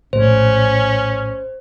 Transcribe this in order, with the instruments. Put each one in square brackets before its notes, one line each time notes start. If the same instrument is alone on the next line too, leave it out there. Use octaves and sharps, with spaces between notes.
[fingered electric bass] A#1 A2 [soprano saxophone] C#4 [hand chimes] C5